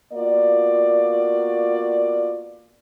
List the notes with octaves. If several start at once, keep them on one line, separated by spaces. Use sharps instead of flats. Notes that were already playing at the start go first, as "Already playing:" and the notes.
A#3 B3 F4 F#4 D5